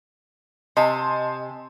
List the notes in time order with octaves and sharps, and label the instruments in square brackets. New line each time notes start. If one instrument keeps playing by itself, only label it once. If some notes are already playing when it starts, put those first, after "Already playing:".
[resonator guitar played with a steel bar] C3 [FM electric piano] D#5 [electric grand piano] G#5 A5 C6